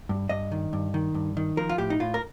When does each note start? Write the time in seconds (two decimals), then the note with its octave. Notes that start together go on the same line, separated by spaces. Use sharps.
0.09 G2
0.29 G2 D#5
0.52 D#3
0.73 G2
0.94 D#3
1.14 G2
1.37 D#3
1.57 F3 A#4
1.69 F4
1.78 A2 G4
1.90 D#4
2.00 A2 F4
2.14 A#4